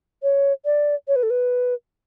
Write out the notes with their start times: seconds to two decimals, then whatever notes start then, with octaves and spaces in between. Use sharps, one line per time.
0.23 C#5
0.65 D5
1.08 C#5
1.16 B4
1.23 A4
1.30 B4